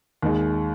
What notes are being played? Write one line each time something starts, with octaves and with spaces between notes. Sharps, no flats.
D#2 D#3 G#3